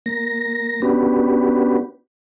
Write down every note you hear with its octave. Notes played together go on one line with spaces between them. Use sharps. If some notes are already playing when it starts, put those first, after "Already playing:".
A#3 A#6
B3 C#4 D4 F#4 G4 B4